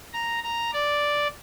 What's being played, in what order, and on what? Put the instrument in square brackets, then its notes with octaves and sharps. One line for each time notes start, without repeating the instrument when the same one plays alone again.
[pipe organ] A#5
A#5
D5